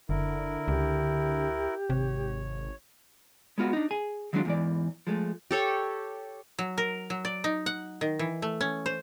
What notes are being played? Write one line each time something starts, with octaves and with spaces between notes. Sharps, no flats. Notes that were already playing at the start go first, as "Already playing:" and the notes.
F#1 D3 E4 A#4
C#2 G4
G#1 C3 C#5
G#3 B3 F4 F#4
D4 D#4
G#4 G#5
D#3 F#3 G#3 C#4 D4 F4
E2 G#2 E3 D5
F3 G#3 A3
G4 A4 C#5
F#3
A#4
F#3
D5
D#4
F#5
D#3
E3
A3
C#4
C5